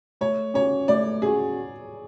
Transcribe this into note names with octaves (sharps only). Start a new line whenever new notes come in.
A3 C#5
C#4 F#4 C#5
A3 D5
C#4 F#4 G#4